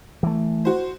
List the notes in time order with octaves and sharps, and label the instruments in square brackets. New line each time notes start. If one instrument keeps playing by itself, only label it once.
[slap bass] E3 A3
[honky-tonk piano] F#4 C5